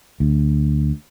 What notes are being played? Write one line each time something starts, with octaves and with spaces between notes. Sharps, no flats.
D2